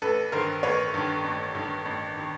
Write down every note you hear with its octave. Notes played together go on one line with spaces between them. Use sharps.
A1 A4 B4
G2 D#3 A#4 C5
A1 B4 C#5
G2 D#3
A1
G2 D#3
A1
D#3